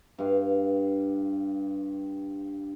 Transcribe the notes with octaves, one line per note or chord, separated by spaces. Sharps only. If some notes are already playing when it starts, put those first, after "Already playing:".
G2 F5